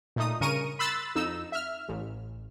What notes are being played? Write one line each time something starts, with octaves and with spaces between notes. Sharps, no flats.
A#2 A3 D#4 D#6
G2 C#3 A#4 C#6 D#7
B5 C6 E6 F#6 A6
F2 D#4 E6
E5 F6
A1